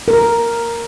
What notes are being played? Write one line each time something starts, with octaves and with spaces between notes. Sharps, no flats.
A#4